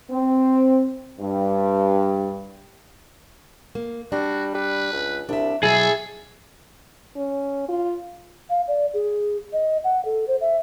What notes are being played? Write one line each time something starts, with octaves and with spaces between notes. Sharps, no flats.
C4
G2
A#3
G3 D4 F#4
G3 B4
C#2
C2 D4 E5
B2 F#3 E4 G#4 A4
C#4
F4
F5
D5
G#4
D#5
F#5
A4
C5
E5